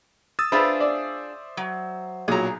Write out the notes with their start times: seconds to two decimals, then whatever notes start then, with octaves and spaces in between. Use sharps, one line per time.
0.39 D#6 E6 A6
0.52 D4 F4 G#4 B4 C5 E5 B5 D#6
0.80 D5
1.57 F#3
2.28 B1 A#2 F#3 G#4 A#5